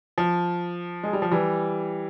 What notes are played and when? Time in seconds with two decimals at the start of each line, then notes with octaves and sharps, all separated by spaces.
0.18 F3
1.03 G#3
1.13 G3
1.22 F3
1.31 E3 G3